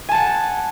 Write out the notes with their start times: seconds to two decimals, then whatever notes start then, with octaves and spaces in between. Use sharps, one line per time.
0.09 G#5
0.11 A5
0.14 F#5